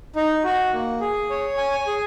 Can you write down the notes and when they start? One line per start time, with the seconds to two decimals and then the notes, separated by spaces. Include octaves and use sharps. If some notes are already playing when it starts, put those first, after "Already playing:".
0.16 D#4
0.44 F#4
0.73 A#3
1.01 G#4
1.30 C#5
1.58 G#5
1.87 G#4